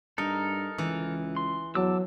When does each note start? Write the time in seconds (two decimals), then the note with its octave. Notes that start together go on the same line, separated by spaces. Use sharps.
0.18 G2 D#4 A4 A#4
0.78 C#2 E3
1.36 C6
1.75 E2 F#3 A5 D6 E6